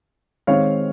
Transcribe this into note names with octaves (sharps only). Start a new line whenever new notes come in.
D#3 G#3 C4 C#5 F5